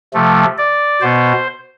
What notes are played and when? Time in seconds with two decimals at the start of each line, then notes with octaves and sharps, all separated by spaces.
0.14 C3 F3 A3
0.58 D5
1.01 B2 B3 C5